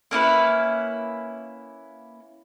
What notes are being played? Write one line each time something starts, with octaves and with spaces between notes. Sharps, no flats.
A#3 C#4 E4 B4